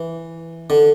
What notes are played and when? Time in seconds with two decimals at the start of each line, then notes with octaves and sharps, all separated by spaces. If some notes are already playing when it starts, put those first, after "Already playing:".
Already playing: E3
0.70 D3